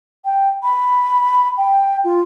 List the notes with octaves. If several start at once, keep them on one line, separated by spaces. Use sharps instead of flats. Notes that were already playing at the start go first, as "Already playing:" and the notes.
G5
B5
G5
F4